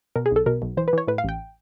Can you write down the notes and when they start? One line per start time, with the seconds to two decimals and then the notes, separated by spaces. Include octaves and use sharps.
0.16 B2 A#4
0.26 G#4
0.31 B1 A4
0.46 B2 A#4
0.62 B1
0.77 E3 C5
0.88 B4
0.93 E3 C#5
1.07 A2 B4
1.18 F5
1.24 A1 G5